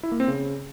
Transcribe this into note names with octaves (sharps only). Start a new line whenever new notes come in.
E4
A#3
C4
C#3